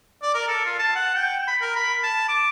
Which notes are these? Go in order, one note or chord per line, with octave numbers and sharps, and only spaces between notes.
D5
A#4
A4
F4
A5
F#5
G5
B5
A#4
B5
A5
D6